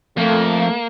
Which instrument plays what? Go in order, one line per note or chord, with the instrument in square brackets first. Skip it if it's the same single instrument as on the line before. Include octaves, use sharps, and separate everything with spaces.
[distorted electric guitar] F2 [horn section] A3 [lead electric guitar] A#3